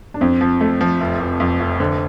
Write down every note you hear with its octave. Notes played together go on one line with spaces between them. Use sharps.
D4
F2 C4
F3
A3
F3
F1
F1
F2
F1
D3 C5